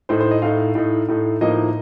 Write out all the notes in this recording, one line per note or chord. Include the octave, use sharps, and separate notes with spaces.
A2 A3 D#4 C5
C5
D#5
A2 A3 D#4 F5
A2 A3 D#4
A2 A3 D#4
A2 F3 A#3 D#4 D#5